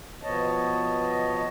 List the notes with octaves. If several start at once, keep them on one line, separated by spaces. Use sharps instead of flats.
B2 F3 B3 C#5 D#5 A5